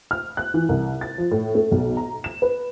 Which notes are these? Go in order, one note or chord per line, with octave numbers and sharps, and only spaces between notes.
F6
F#6
E3
C2
A6
F3
A2
A3
B1
A#5
E7
B4